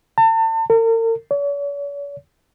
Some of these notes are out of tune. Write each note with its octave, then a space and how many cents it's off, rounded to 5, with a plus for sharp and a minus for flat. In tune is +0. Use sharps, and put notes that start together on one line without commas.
A5 +35
A#4 -45
C#5 +45